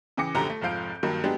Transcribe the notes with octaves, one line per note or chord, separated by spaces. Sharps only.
C#3 E3 G5 D6 A#6 C#7
A#1 F#2 D3 G4 A#5
A3
F1 G#2 F3 F5 G6 D7
G2 D#3 F#3 A#3
F#3 G#3 B3 D4 G4